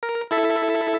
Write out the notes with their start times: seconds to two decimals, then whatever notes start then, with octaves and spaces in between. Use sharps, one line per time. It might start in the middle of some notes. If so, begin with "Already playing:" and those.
0.03 A#4
0.31 E4 A4 E5